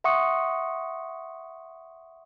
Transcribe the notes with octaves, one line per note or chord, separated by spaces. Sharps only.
E5 F#5 C6 C#6 D#6 C#7